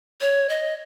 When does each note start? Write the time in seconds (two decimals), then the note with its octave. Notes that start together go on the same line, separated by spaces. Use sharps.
0.21 C#5
0.49 D#5